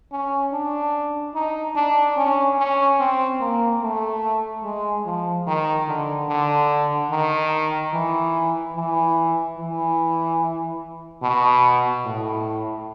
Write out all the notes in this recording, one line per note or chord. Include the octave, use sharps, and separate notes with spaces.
C#4
D4
D#4
D4
C#4
C#4
C4
A#3
A3
G#3
F3
D#3
D3
D3
D#3
E3
E3
E3
B2
A2